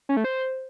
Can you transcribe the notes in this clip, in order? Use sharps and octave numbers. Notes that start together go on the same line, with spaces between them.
C#4
A3
C5